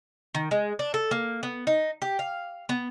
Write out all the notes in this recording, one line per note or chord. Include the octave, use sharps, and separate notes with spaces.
D#3
G#3
D4
A4
A#3
B3
D#4
G4
F5
B3